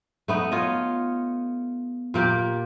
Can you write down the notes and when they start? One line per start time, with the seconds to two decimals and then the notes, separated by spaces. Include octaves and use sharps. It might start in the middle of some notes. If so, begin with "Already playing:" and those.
0.28 A3 B3 D#4
0.52 F4 C#5 D#5
2.14 A#2 A#3 G4 D5